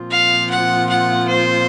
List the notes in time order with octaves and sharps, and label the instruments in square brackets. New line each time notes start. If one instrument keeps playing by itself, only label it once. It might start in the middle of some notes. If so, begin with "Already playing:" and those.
Already playing: [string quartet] A#2 F3 C4 F4
[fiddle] F5
F#5
F#5
C5